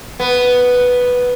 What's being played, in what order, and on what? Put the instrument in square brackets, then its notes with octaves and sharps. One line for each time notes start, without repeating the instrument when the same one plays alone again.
[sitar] B3